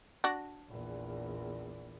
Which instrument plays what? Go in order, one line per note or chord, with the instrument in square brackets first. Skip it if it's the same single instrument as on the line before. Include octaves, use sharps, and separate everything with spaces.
[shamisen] D4 F#4
[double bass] A#1 E2